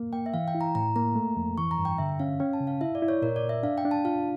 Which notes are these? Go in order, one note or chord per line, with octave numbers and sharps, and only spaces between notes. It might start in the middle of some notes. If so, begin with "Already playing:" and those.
Already playing: A#3
A#3 G5
E5
E3 F5
G5
E4
A#5
A2 A#5
A#3 A#5
A3
F2
E3 C#6
A#5
G2
G5
D3 E5
C#4 F5
C#4 G5
A5
C#3
F5
E4 E5
D5
E4
C#5
A#2 A#4
D5
A#2
E5
D4 F5
G5
D4
A5
F4 F5